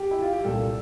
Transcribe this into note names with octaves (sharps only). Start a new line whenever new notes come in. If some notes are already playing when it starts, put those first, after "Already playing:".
Already playing: G4
E4
F4
G4
C2 A#2 A3 A4